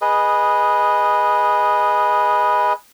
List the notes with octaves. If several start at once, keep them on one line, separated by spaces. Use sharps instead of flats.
G#4 B4 D#5